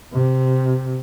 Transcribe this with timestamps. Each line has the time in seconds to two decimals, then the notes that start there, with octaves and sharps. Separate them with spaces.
0.13 C3